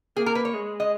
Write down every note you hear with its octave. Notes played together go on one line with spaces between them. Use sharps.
A#3 G#4
A#4
B4
C#5
G#3
D#5